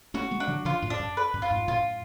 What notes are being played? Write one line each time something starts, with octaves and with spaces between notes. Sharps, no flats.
A3 C#4 F#4
G#3 B3
D4
D3 F#3
C#3 F3 F4
F#2 A2
D4
F#2
B4
F#2
F4
F2 G#2
F#2 A2 F4